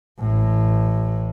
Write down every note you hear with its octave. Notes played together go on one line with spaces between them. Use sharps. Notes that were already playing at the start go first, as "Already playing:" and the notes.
A1 A2